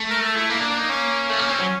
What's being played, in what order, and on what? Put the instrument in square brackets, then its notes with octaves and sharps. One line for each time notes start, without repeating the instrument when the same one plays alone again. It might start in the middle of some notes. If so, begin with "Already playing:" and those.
Already playing: [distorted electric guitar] A3
[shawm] A#4
A4
E4
[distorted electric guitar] A#3 [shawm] E4
[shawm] D4
D4
D#4
C#4
[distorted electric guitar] A3
A#3
C4
F#3